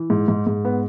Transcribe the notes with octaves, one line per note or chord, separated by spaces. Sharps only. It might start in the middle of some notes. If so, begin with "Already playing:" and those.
Already playing: E3
G#2
G#2
G#2
B3